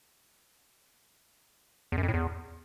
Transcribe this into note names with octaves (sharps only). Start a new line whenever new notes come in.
E2
F#2
F2
A2
E2